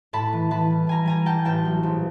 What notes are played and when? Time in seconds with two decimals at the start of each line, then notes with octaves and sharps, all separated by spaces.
0.13 A2 A5 B5
0.33 E3
0.51 E3 A5 B5
0.71 G3
0.87 G3 G#5 A#5
1.06 G3 G#5 A#5
1.26 G3 G5 A5
1.45 A1 G5 A5
1.65 F#3
1.83 A#1